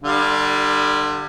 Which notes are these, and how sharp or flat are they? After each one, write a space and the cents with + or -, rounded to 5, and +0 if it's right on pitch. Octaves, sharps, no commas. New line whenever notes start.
D3 +35 G3 +0 F5 +0